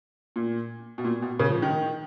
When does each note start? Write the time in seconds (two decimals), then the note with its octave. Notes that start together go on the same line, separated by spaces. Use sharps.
0.36 A#2
0.98 B2
1.05 A#2
1.22 B2
1.39 C#3
1.50 F3
1.62 D#3